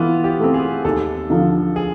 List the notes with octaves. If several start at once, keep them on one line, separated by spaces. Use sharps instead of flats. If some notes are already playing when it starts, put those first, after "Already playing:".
Already playing: E3 B3 F4
G4
A3 C4
G#4
D#2 A4
D3 F3
G#4